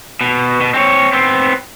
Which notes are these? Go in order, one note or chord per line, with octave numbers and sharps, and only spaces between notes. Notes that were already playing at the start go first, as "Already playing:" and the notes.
B2
B2
C4 C#5
B3 C4